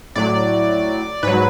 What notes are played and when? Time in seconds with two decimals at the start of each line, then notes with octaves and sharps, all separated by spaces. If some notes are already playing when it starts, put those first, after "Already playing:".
0.15 A2 F#3 D5
1.23 G#2 F#3 B4